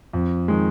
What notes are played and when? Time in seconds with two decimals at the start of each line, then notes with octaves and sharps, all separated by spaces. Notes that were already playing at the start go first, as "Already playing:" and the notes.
0.13 F2
0.48 D#3 G#3